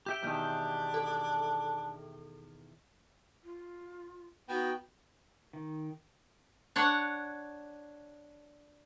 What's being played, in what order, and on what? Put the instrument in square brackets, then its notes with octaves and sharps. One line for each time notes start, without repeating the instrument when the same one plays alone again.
[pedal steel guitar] G4 E5 G5 [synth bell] G6
[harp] E2 B2 D#3 [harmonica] D4
[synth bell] A4
[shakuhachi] F4
[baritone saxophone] B3 [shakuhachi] D#4 [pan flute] F#4 [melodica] G5
[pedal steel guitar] D#3
[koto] D4 C#5 F#5